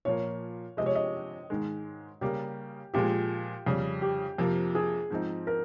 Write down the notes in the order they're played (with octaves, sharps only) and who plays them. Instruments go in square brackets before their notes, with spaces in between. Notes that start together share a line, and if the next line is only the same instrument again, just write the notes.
[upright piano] A#2 F3 A#3 [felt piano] C#5
[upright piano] C3 F3 G#3 [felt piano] D#5
[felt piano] C#5
D#5
[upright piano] G#2 D#3 G#3
[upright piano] C#3 G3 A#3 [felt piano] G4
[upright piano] A#2 F3 G#3 [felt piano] G4
[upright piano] F2 C#3 G3
[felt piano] G4
[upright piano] F2 C3 F3 A#3
[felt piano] G#4
[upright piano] G#2 F3 C4 D#4
[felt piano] A#4